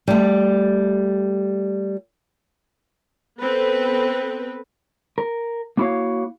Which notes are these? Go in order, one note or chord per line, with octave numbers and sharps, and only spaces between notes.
G3 A3
B3 C4 A4 B4
A#4
A#3 B3 E4 F#4 C#5 F5